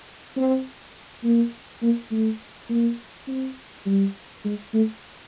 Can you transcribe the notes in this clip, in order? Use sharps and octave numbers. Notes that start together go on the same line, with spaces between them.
C4
A#3
A#3
A3
A#3
C4
G3
G#3
A3